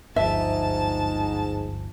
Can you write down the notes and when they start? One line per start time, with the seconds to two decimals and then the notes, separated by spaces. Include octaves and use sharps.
0.16 G1 D2 G#2 F3 E5 A5